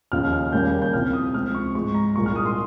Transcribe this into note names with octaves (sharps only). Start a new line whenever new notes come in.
D#2 C#3 F3 F6
F6
D#2 C#3 G3 A#3 G6
G6
C2 C3 F3 C4 F6
D#6
C#2 C3 F3 C4 F6
C#6
G#2 F3 G#3 C#6
A#5
C2 A#2 G#3 C#6
F6
D#6
C6